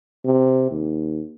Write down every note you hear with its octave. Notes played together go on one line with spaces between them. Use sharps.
C3
D#2